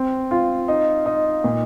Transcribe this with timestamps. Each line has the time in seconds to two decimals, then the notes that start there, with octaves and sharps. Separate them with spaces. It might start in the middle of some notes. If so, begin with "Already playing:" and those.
Already playing: C4
0.31 F4
0.68 D#4
1.06 D#4
1.44 A#2